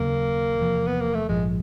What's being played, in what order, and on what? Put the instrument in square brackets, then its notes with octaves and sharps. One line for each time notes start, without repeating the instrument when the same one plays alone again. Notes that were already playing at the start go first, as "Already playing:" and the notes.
Already playing: [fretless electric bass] D#2 C#3 F#3 [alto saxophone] A#3
[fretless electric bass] E2 C3 F3
[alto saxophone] B3
A#3
A3
[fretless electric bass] A#1 G#2 F3 [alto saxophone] G#3